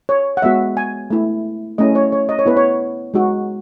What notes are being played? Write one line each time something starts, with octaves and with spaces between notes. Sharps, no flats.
C#5
F#5
G#3 B3 F#4 E5
G#5
A3 E4
A3 C#4 E4 D#5
C#5
C#5
D#5
C#5
B3 E4 B4
C#5
G#3 D#4 F#4